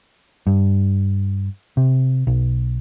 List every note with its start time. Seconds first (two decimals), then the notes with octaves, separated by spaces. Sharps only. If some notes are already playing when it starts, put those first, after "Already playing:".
0.47 G2
1.77 C3
2.27 B1